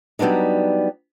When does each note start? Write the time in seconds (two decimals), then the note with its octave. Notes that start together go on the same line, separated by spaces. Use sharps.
0.19 F#3 G3 B3 D4 D#4